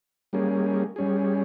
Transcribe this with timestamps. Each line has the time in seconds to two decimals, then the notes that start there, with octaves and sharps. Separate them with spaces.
0.33 G3 A#3 C#4 G#4
0.96 G3 C#4 G#4